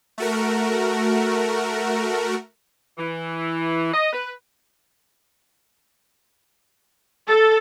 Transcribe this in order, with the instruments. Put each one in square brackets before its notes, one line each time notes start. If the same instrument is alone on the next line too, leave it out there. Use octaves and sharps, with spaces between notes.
[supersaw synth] A3 F#4 A#4
[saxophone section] E3
D#5
B4
[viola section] A4